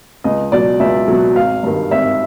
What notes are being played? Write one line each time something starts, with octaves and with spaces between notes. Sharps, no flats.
C#2 D#5
B2 F#3 D5
C#2 E5
B2 F#3
G#1 F5
G2 D#3
G#1 E5